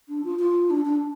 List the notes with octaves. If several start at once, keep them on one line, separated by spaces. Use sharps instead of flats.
D4
F4
F4
D4
D4